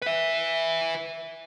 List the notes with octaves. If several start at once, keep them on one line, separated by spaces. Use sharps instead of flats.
B4 E5